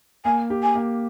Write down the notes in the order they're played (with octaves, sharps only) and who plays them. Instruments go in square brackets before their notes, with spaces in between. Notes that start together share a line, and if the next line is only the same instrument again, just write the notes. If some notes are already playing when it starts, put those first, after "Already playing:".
[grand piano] A#3 [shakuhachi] G#5
[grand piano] G4
[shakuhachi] G#5
[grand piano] A#3